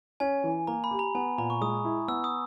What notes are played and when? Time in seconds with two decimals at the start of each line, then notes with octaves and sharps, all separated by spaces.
0.20 C#4 G#5
0.44 E3
0.67 A#3 A#5
0.84 B5
0.91 G4
0.99 A#5
1.15 B3 G#5
1.38 A#2 A#5
1.50 C#6
1.61 G#3 D#6
1.84 E4
2.08 B3 E6
2.24 D#6